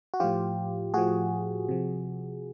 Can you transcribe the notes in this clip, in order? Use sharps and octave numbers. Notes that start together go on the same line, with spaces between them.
F#4
A2 F3 F4 G4
A2 F3 F#4 G#4
C3 F3